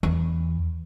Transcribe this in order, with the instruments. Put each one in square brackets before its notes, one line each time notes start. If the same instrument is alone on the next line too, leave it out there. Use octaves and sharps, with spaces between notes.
[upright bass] E2